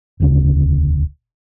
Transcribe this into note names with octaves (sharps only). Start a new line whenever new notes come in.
E1 D2 C#3